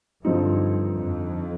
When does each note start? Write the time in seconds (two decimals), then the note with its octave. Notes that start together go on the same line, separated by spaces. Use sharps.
0.24 G2 D3 F3 C4 D#4
0.96 F2